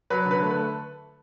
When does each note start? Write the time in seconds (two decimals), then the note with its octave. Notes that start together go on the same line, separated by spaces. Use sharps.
0.10 F#3 B4
0.25 D3
0.31 B4
0.41 A3
0.50 B4
0.55 A3